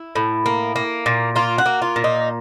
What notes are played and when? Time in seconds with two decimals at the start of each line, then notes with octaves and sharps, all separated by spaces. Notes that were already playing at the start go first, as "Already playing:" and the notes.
Already playing: E4
0.15 A2
0.46 A#3
0.76 A#3
1.06 A#2
1.36 A#3 F4
1.58 F#4
1.66 A#3
1.82 F4
1.96 A#2
2.04 D#4